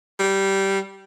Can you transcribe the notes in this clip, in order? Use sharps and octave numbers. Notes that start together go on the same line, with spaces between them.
G3